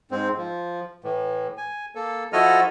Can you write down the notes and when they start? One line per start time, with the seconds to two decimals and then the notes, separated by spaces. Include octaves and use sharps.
0.11 G#2 C4
0.38 F3
1.04 A2 E3
1.58 G#5
1.95 A#3 A4
2.33 F3 E4 F#4 A4 D#5 F6